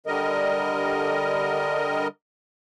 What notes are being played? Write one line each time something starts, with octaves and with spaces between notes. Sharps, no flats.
D3 G3 A#4 D#5